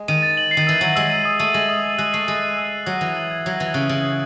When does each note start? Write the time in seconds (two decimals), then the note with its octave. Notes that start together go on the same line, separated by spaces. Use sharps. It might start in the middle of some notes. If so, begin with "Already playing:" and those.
Already playing: G#3
0.08 D#3 D#7
0.22 A6
0.37 F#7
0.51 C7
0.57 D#3
0.67 E3 E6
0.81 F#3 C7
0.96 G#3 E6
1.10 D#7
1.25 D#6
1.40 A3 D#7
1.54 G#3 F#7
1.69 D#6
1.84 A6
1.98 G#3 F#6
2.13 A3 C7
2.27 G#3 D#7
2.43 D#7
2.57 E6
2.73 A6
2.86 F#3 F#6
3.01 E3 F#6
3.17 F#7
3.31 G#6
3.45 F#3 G#6
3.60 E3 G#6
3.74 C#3 F#6
3.89 C#3 F#7
4.04 C7